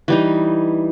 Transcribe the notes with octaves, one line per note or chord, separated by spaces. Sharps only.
E3 G3 D#4